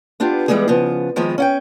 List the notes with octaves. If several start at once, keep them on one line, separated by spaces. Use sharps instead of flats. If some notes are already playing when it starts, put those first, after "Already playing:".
B3 D4 F4 G4
E3 F3 G3 G#3 B3 G#4
C#3 F3 B3
D#3 F3 G#3 B3
C#4 F#5 G5